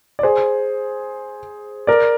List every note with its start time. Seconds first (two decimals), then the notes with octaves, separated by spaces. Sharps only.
0.19 D5
0.23 G#4 C5
1.87 A#4 D5